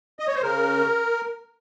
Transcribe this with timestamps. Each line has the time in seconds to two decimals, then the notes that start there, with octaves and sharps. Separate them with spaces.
0.19 D#5
0.27 C#5
0.35 C5
0.43 C#3 A#4